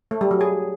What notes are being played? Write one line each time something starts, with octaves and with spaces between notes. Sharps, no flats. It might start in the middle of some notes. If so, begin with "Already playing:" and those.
A3
G3
F#3
G#4